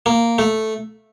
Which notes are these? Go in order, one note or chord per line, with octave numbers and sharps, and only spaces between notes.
A#3
A3